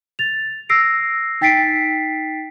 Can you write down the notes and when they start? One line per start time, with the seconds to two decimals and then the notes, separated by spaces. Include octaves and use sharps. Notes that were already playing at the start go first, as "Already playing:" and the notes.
0.19 A6 F7
0.69 E6 A#6 C7 D7
1.41 D#4 G5 A6 B6 C7 D7